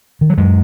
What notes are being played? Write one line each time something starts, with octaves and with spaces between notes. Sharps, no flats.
D#3
F#3
F#2 G#3